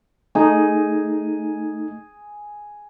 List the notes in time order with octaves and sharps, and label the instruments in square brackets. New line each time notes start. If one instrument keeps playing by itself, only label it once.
[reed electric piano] A3 D#4 [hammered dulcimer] G#4